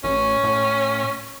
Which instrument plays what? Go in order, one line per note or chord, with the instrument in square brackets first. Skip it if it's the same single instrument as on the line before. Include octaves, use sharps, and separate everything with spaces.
[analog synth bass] A1 [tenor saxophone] C#4
[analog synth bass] A2